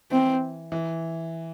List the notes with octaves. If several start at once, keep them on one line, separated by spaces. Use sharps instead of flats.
E3 C4
E3